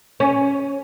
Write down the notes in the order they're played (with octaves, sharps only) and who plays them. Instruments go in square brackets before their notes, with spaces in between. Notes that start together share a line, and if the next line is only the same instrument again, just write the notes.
[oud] C#4